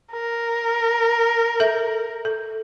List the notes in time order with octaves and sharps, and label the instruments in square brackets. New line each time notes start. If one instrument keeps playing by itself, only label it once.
[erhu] A#4
[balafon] A4 E5
A4